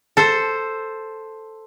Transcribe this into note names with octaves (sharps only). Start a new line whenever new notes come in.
A4 C5